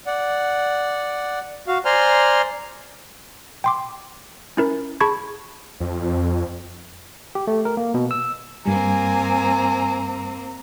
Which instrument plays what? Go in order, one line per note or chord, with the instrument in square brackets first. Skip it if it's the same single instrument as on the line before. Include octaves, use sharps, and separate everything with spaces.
[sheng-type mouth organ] D5 F#5
F#4 F5
C5 D5 G#5 A#5 C6 F6
[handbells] G5 C6 D6
C#4 E4 A#4
G#4 A5 B5 C#6 G#6
[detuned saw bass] F2
[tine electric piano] G4
A3
A#4
A#3
B2
E6
[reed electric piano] G2 G3 [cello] A#3 C4 [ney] G#5 [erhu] A#5